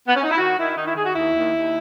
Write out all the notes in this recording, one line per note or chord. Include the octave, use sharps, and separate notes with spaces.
B3
C#4
D#4
E4
D#3 F#4
D#3 E4
D#3 D#4
E4
D#3 G#4
F#4
D#2 E4
D#2
D#2